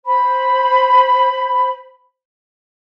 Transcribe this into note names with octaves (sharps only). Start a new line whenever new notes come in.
C5 B5